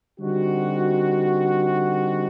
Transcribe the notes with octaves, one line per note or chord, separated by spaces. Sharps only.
D3 G3 C4 D#4 F#4